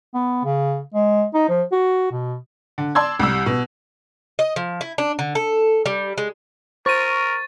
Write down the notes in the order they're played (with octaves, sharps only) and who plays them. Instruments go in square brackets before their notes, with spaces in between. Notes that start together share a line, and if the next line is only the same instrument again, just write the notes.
[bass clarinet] B3
C#3
G#3
D#4
F3
F#4
B2
[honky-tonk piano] D3
D5 A5 C6 E6 G#6
C2 G3 E6
B2
[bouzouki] D#5
F3
E4
D4
D3
A4
G3
G#3
[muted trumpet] A#4 [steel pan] C5 [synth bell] C#6 D#7 [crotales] A6